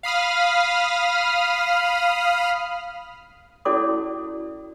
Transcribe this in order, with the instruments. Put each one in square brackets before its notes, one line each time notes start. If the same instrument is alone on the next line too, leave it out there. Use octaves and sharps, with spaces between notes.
[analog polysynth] F5 B5 D#6 F6
[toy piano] C#4 E4 F#4 A4 D5 D6